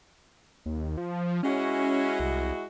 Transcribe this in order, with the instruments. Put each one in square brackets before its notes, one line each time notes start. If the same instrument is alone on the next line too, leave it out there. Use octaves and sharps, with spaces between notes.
[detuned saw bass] D#2
F3
[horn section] G#3 E4 F#4 [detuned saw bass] C#4
[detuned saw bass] C2